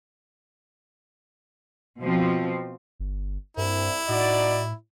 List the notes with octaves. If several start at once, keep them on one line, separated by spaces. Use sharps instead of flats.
B2 F3 C4
G1
C2 G2 E4
A2 D#4 F#4 D5